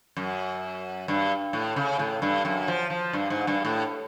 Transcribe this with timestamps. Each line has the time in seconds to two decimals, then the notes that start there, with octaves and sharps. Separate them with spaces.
0.17 F#2
1.08 G2
1.53 A2
1.76 C#3
1.99 A2
2.22 G2
2.45 F#2
2.68 F3
2.90 F3
3.13 G2
3.30 G#2
3.47 G2
3.65 A2